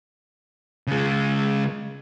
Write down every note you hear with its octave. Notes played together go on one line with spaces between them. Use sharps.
C#3 G#3